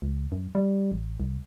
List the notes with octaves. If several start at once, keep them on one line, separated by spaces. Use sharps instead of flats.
C#2
F#2
G3
A1
C2